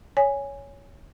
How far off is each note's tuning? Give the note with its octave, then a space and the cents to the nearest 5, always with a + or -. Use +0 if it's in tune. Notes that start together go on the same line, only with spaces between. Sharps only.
C#5 +10 G#5 -5